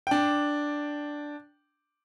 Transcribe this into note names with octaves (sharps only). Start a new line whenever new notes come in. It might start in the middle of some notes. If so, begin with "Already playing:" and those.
D4 G5